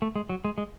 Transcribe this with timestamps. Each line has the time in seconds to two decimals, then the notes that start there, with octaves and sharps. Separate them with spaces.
0.02 A3
0.16 G#3
0.29 F#3
0.44 G#3
0.58 G#3